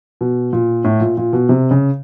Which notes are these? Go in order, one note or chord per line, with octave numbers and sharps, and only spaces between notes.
B2
A#2
A2
A#2
A#2
B2
C3
C#3